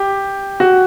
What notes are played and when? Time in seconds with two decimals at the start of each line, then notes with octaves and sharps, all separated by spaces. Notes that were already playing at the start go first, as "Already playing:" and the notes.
Already playing: G4
0.60 F#4